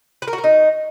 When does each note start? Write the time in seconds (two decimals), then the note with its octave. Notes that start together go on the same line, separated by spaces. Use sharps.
0.22 B4
0.28 A#4
0.33 F#4
0.38 A#4
0.44 D#4